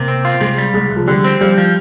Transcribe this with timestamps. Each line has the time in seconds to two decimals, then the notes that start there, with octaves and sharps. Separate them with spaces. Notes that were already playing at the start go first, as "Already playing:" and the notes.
Already playing: C3 A#3
0.08 C4
0.25 F4
0.40 C3 G#3
0.58 G3
0.74 C2 G#3
0.91 C2
0.97 F3
1.07 D3 G3
1.24 C4
1.41 F3 G3
1.58 F3